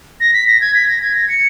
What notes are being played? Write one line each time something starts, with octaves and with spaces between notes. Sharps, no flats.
A#6
B6
A#6
G#6
B6
A#6
G#6
A#6
C#7